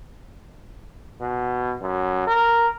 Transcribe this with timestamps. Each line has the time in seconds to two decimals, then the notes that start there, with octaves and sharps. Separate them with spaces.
1.21 B2
1.82 F#2
2.27 A#4